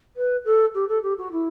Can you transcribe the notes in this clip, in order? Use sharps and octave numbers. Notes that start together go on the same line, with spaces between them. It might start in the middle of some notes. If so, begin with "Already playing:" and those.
B4
A4
G4
A4
G4
F#4
E4